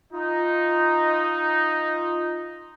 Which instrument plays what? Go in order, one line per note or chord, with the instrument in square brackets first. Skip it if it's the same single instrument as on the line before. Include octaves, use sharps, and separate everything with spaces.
[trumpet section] D#4 [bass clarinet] F4